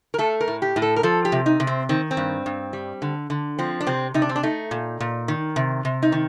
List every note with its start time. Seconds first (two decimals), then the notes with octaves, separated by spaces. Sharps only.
0.14 A#4
0.18 A3 A4
0.41 A#4
0.48 A2
0.62 G4
0.76 A2
0.82 A4
0.96 A#4
1.03 F3 A4
1.25 G4
1.32 C3
1.46 D#4
1.60 C3
1.67 C4
1.89 D#3 C4
2.11 C4
2.17 G2
2.46 G2
2.73 G3
3.02 D3
3.30 D3
3.59 F3 C4
3.81 D4
3.87 C3 C4
4.14 C3 D#4
4.22 D4
4.29 C4
4.36 D4
4.43 A3 D#4
4.71 A#2
5.00 A#2
5.28 D#3
5.56 C3
5.85 C3
6.03 D#4
6.12 D#3